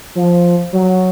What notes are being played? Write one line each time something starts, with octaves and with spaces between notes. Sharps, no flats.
F3
F#3